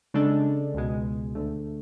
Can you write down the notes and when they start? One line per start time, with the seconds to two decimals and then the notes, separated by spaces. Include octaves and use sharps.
0.14 C#3 G#3 D4 A4
0.74 C#2 B2 G#3
1.35 D2 D3 A3